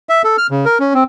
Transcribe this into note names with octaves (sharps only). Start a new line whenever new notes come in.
E5
A4
F6
C#3
A#4
C#4
C4